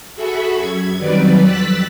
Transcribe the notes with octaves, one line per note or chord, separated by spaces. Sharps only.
F#4 G#4 A4 E5 B5 C#6
F#2 G#6
D#3 F#3 G3 C4 B4 D5
F2 E6 F#6 A6 B6